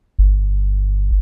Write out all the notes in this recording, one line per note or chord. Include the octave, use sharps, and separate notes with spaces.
G1